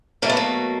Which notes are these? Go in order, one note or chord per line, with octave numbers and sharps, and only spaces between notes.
B2 F#3 A3 A#3
B3
A#3